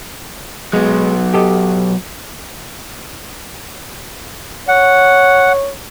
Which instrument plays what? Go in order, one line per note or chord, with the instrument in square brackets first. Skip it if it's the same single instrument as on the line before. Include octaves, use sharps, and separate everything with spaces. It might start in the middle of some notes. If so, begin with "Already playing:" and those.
[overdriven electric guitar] F#3 B3 [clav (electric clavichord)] G#3
[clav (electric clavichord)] G4 A4 D#5
[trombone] C#5 [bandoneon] F#5